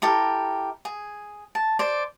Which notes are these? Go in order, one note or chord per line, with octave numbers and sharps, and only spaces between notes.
E4 G4 A4 A#4
G#4
A5
C5 D5